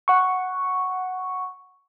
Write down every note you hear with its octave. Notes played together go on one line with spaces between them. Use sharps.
F#5 C#6